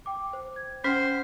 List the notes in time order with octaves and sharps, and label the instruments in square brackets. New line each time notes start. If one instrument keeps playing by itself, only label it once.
[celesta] G5 D6
C5
G#6
[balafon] C#4 [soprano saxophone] C5 [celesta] F#5 G5 F6